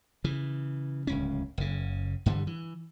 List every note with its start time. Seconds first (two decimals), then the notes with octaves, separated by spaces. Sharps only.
0.24 C#3 E3
1.07 D1 C#2 C#4
1.58 F#1 C#3
2.26 G2 D3 E3 G3
2.47 E3